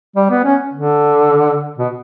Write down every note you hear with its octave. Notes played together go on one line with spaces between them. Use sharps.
G3
B3
C#4
D3
B2